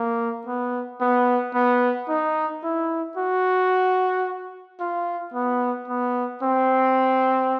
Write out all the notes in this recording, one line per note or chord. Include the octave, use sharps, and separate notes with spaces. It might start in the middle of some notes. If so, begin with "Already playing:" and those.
Already playing: A#3
B3
B3
B3
D#4
E4
F#4
F4
B3
B3
C4